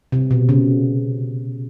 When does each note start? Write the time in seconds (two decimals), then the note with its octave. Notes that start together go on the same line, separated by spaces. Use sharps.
0.12 C3
0.31 B2
0.49 C#3